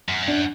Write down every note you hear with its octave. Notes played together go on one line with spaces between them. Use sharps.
F#2
G2
F#2 D4